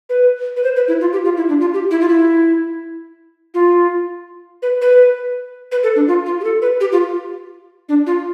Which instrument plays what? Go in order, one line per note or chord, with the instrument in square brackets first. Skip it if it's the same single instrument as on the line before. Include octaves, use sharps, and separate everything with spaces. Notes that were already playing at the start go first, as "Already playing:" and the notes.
[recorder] B4
B4
C5
B4
E4
F4
G4
F4
E4
D4
F4
G4
E4
F4
E4
F4
B4
B4
B4
A4
D4
F4
F4
G4
A4
B4
G4
F4
D4
F4